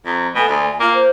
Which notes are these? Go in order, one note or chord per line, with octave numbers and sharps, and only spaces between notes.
F2 A#5
B2 A3 G#5
D2
A#3 F4 A#5
C5